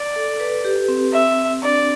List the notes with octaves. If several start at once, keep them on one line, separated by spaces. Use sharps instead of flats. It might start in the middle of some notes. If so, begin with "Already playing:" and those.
Already playing: D5
A4
B4
G4
C4
E5
D4 D5